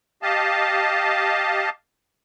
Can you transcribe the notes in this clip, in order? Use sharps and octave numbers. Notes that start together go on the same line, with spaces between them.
G4 D#5 F5 A5